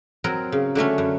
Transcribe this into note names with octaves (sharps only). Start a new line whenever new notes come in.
F#3 C4 A#4
C#3
D3 F#3 A3 C#4
F#2